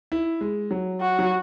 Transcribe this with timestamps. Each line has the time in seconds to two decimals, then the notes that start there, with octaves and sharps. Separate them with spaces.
0.12 E4
0.41 G#3
0.71 F#3
1.00 F#4
1.19 F#3